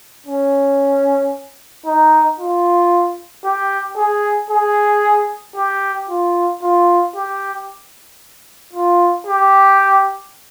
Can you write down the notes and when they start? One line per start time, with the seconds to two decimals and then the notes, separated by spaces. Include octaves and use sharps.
0.26 C#4
1.86 D#4
2.39 F4
3.44 G4
3.97 G#4
4.51 G#4
5.56 G4
6.09 F4
6.62 F4
7.15 G4
8.73 F4
9.27 G4